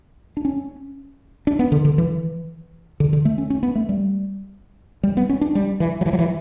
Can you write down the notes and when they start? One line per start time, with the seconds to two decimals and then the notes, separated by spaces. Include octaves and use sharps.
0.37 D4
0.45 C#4
1.47 D4
1.59 B3
1.72 D3
1.85 D3
1.98 E3
3.00 D3
3.13 D3
3.25 A3
3.38 C#4
3.50 C#4
3.63 B3
3.76 A3
3.89 G3
5.03 G3
5.17 B3
5.29 C#4
5.41 D4
5.55 G3
5.80 E3
6.01 F#3
6.06 E3
6.13 F#3
6.19 E3